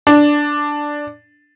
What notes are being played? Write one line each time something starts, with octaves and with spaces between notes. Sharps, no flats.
D4